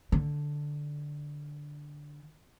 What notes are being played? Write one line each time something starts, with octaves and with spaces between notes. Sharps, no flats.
D3